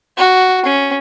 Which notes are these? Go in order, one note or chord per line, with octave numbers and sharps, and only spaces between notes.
F#4
C#4